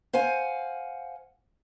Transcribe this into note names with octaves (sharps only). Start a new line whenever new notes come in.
C5 F5 F#5 G#5